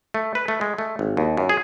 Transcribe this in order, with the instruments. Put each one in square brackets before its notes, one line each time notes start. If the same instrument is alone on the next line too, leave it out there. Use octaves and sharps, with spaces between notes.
[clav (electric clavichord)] A3
B4
A3
G#3
A3
G#1
D#2
F#2
G#4